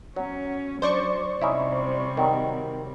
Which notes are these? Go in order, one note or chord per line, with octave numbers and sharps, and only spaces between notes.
F#3 C#4
F#3 D4 C5 D5 C#6
C3 G3 C#4 D#4 E4
D#3 F#3